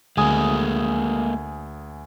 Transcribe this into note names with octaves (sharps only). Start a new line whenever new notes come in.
D2 G#3 A#3 G#5 D#6